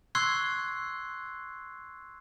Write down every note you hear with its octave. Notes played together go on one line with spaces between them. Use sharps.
C6 C#6 E6 F#6 G#6 C7